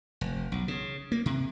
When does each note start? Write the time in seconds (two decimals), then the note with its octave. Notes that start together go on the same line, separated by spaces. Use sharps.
0.21 F1
0.52 B1
0.68 C#3
1.12 A#3
1.26 C3